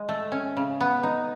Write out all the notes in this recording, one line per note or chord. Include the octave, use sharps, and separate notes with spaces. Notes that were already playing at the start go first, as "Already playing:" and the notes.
Already playing: G#3
A3
C#4
C#3
B3
D#4